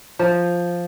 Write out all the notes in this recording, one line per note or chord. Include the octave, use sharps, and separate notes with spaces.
F3